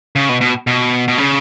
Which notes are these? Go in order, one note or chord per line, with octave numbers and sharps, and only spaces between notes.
C#3
B2
B2
B2
B2
C#3